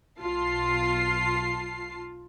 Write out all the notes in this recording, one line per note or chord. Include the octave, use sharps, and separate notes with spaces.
B1 F4 A5 C7